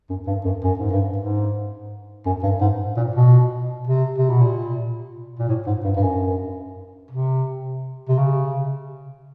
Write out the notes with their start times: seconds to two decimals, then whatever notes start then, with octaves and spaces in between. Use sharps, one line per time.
0.10 F#2
0.27 G2
0.45 F#2
0.64 F#2
0.79 G#2
0.91 G2
1.18 G#2
2.26 F#2
2.43 G2
2.61 G#2
2.97 A#2
3.16 B2
3.87 C3
4.18 C3
4.30 B2
4.41 A#2
5.39 A#2
5.49 A2
5.67 G#2
5.85 G2
5.96 G2
6.03 F#2
7.11 C3
8.09 C3
8.18 C#3